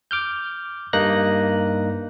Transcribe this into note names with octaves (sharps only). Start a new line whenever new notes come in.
D6 F6 G6
G2 A#3 D#4 F#6 A#6